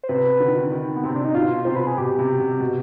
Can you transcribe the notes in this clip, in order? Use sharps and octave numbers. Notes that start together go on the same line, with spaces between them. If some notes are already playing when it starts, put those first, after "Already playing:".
C5
C3 B4
D3
D#3
D3
D#3
B3
C3 C4
D4
D#4
B2 F4
C3 C5
B4
G#4
B2 G4
C3
C3
B2